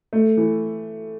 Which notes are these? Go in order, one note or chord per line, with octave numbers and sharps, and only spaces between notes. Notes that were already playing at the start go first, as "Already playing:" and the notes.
A3
E3